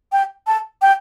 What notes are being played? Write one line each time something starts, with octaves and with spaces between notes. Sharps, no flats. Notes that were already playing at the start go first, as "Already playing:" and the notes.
G5
A5
G5